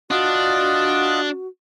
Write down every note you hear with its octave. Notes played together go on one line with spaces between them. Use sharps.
D4 F4 F#4 D#5 F#5